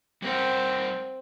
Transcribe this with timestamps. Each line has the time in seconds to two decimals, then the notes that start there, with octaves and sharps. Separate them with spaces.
0.22 G3 C4 A#4 F#5